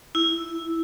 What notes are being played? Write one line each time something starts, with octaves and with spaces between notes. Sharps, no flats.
E4